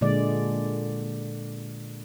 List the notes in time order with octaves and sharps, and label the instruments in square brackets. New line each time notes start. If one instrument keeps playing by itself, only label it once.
[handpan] A#2 D3 G#3 D5